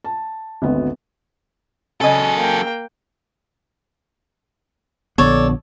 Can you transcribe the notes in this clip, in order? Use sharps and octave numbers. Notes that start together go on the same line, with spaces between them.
A5
G#1 D2 B3
C#3 F#3 A4 D#5 G#5
A#3 G5
A#1 D3 B3 A4 C#5 D5